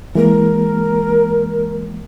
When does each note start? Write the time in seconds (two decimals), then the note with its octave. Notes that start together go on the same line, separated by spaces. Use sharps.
0.15 E3 G#3 A#3 A#4